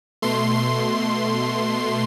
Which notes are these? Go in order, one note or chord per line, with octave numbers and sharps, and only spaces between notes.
B2 A3 C6
C6